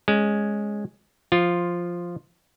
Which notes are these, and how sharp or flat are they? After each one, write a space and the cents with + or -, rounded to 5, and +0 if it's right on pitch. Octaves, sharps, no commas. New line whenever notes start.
G#3 +0 C#4 -5
F3 +0 F4 +0